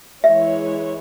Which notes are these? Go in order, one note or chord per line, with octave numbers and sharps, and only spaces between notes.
E3 G#3 E4 C#5 E5